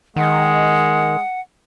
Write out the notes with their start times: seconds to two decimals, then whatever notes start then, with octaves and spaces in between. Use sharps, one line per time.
0.16 D#3 G#3 F#5